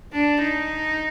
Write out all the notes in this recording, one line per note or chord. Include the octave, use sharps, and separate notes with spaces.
D4
D#4